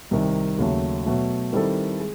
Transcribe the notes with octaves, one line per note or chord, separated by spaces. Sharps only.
C2 C3 D#3
D#2 C#3 F#3 A3
B2 F#3 A3
D#3 G3 C4 E4 A4
G#3